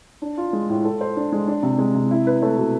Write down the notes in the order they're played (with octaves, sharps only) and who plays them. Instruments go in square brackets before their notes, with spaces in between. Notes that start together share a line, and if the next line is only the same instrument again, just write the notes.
[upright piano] D4
F4
G#3
A2
A4
C5
D4
G#3
D4
C3
G#3
C3
E4
B4
A3
B2